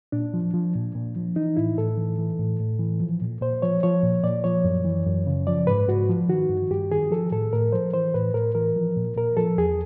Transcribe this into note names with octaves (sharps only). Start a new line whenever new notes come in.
A#2 D4
F3
F3
A#2
A#2
F3
E3 D#4
A2 E4
A2 A4
E3
E3
A2
A2
E3
F3
A#2
A#2 C5
F3 C#5
F3 C#5
A#2
A#2 D5
F3 C#5
F#2
E3
F#2
C#3
F3 D5
G#2 B4
G#2 F#4
F3
D#3 F#4
G2
G2 G4
D#3 G#4
F3 A4
A2 A4
A2 A#4
F3 C5
E3 C5
A2 B4
A2 A#4
E3 A#4
F3
A#2
A#2 A#4
F3 A4
E2 G#4